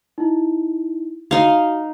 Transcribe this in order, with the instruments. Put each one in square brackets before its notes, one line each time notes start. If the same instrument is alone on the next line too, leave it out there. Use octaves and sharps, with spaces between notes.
[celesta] D#4 E4
[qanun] D#4 F5 [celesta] F#4